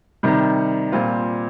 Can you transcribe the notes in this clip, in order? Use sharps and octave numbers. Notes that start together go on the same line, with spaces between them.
C3 D#3 G3
A#2 G3 C4 F4